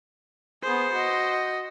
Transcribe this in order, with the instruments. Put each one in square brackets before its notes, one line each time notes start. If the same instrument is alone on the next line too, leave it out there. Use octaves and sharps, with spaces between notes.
[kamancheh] B3 G#4 [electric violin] C5
[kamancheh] F#4 D#5